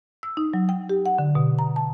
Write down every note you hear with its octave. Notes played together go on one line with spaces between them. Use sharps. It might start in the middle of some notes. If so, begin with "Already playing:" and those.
E6
D#4
F#3
G5
G4
F#5
D3
B2
A#5
A5